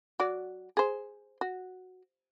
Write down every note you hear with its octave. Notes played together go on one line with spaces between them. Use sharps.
F#3 F#4 D5
G#4 C5
F#4